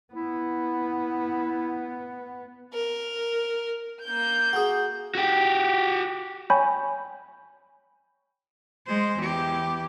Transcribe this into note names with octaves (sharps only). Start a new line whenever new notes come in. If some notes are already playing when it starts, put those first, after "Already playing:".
B3 E4
A#4
A#3 G6
F#4 G#4
F#4 G4
C#5 G5 G#5 B5 C#6 G6
G#3 C5
E2 G4